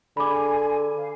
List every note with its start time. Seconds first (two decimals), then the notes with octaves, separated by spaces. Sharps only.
0.17 D3 G#4 G#5 B5 D6
0.96 C5 F5